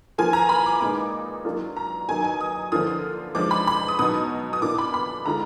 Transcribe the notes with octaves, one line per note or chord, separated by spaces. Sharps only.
F3 A#3 F4 G#5
A#5
B5
D6
A#2 G#3 D#4 D6
F#3 A#3 D4 F4
A#5
F#3 A#3 D#4 G#5
G#5
D#6
D3 F3 A#3 D4 F4 D#6
F3 G#3 D4 D6
B5
B5
D#6
B2 F#3 B3 D#4 D#6
D#6
B2 A#3 D4 F4 D6
B5
B5
D3 G#3 D4 F4 A#5